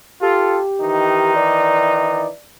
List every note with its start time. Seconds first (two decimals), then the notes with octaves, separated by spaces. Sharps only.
0.21 F4 G4 A4
0.81 D#3 E3 D#4
1.36 D5